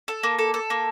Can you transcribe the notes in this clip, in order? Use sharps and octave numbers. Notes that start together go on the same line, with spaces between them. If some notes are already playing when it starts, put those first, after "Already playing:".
A4
A#3
A4
A4
A#3